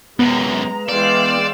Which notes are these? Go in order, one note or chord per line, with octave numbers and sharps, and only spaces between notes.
F#2 C3 G#3 B3 A#5
E3 G#3 D5 F5 G5 C6 E6